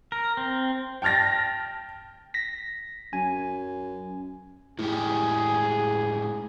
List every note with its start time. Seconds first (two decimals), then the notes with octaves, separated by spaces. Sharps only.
0.12 A#4
0.37 C4
1.02 G5 A5 F6 A6 A#6
2.34 A#6 B6
3.13 F#2 G#5
4.79 A2 G#3 E4 G4 G#4